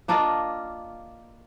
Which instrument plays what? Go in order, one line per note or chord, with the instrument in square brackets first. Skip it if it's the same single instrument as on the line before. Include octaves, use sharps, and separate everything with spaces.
[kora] A#3 D4 F4 D#5